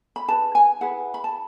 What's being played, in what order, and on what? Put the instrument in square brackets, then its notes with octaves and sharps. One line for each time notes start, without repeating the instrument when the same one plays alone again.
[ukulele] B5
D#4 G#4 B4 A5
G#5
E4 G#4 B4 F#5
B5
A5